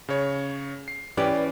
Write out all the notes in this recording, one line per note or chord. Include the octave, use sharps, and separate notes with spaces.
C#3 C#5
C7
E3 C#4 G4 B4 D5